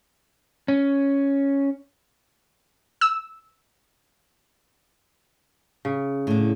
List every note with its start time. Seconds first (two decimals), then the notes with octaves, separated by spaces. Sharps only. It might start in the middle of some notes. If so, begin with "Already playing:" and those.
0.68 C#4
3.01 E6
5.85 C#3
6.27 A2 D3